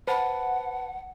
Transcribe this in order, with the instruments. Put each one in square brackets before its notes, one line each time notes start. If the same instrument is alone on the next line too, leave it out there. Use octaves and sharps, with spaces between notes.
[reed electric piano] B4 A5 [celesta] C5 B5 [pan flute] F#5